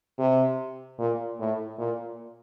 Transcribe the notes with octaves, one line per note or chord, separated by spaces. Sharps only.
C3
A#2
A2
A#2